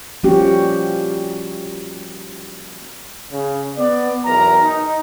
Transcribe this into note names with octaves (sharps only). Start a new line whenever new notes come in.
F3 G3 A#3 C#4 F#4 G4
C#3
B3 D5
B1 E2 A#4 A#5
D#4